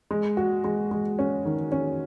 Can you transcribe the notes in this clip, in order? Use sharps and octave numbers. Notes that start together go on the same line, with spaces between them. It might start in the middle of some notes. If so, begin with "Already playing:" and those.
G#3
F#4
G#3
G#3
C#4
D#3
C#4